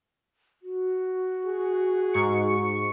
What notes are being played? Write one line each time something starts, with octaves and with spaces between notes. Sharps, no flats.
F#4
G#4
G#2 C#6 C#7